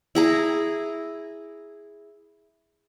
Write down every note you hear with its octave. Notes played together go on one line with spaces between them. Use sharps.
E4 G#4 A#5